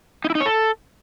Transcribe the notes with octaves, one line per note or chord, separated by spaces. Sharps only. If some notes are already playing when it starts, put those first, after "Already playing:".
D#4
E4
D#4
C#5
A4